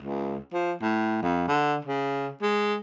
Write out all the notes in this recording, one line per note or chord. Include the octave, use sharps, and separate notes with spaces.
C#2
F3
A2
F2
D3
C#3
G#3